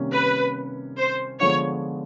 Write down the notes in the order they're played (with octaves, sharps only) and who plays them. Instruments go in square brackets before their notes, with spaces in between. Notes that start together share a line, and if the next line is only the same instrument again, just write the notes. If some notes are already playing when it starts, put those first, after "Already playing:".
Already playing: [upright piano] C3 D#3 G3 A#3 C#4
[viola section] B4
C5
[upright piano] D3 F3 G#3 B3 [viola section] C#5